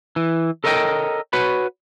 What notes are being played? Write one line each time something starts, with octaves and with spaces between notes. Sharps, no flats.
E3
A4 A#4 C#5 D#5 F5 G5
F#4 B4 C#5 B5